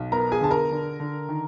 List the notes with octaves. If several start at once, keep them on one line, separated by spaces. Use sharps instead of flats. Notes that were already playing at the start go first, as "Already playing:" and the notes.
Already playing: B1
B3 A#4 A#5
G#4 G#5
D3 A5
A#4 A#5
D3
D3
D#3